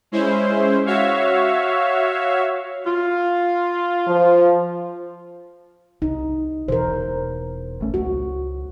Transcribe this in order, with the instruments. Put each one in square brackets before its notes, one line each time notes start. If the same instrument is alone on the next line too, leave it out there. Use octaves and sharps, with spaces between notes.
[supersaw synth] G#3 C#4 E4 C5
F#4 C#5 E5 F5
[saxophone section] F4
[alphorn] F3
[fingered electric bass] C2 [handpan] D#4
[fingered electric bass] E1 B2 E3 [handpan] A#4 C5
[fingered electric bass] A1 A3 C#4
[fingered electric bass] C#2 [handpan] F#4